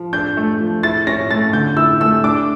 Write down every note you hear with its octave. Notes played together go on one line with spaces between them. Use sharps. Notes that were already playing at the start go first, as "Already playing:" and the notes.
Already playing: F3
D4 G6
A3
F3
E4 A6
C#4 A#6
A3 A6
D3 G6
E4 E6
A3 E6
D4 D6